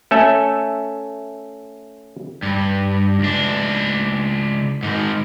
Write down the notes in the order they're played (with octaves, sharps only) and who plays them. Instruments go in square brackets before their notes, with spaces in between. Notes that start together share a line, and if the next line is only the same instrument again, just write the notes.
[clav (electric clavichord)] A3 C#4 A4 E5
[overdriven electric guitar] G2
C#2 D4
G#2 D#3